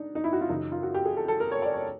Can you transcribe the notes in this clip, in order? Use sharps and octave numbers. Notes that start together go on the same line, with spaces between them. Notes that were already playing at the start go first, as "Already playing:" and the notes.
Already playing: D4 D#4
D#4
E4
F#4
F4
F#2 C#3 E3 D#4
F4
F#4
G4
G#4
A4
A4
A#4
C#5
D5
C#5